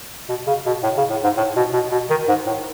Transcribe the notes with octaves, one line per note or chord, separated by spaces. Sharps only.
B2
C#3
B2
A2
C#3
A2
G#2
A2
B2
B2
B2
D#3
G#2
A2